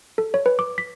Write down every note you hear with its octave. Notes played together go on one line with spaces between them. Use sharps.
A4
C#5
B4
D6
B6